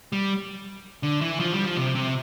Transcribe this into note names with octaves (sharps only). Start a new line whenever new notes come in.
G3
D3
E3
F3
G3
F3
C3
C3